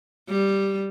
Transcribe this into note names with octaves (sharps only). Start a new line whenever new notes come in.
G3